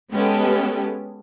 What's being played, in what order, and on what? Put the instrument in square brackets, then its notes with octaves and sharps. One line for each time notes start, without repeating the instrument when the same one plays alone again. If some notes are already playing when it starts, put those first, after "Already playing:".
[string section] G#3 B3 C#4 G4 A4